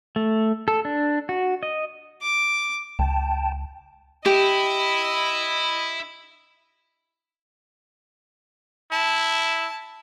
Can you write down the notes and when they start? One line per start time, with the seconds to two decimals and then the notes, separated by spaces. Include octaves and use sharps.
0.16 A3
0.68 A4
0.85 D4
1.29 F#4
1.63 D#5
2.22 D6
2.99 C#2 G5 A5
4.26 E4 G4 D#5 B5
8.92 E4 A5